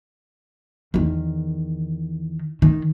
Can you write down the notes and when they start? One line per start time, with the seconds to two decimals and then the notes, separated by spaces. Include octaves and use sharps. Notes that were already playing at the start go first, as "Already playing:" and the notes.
0.94 E2 D#3
2.62 D#3